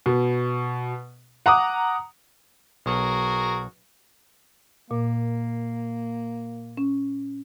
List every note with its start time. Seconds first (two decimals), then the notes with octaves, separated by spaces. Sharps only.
0.06 B2
1.46 F#5 A#5 D6 D#6
2.86 B1 F#4 G#4 A#4
4.91 A#2 A#3
6.77 C#4